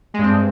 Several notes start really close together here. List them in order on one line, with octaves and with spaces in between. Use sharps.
G#3 G2 C4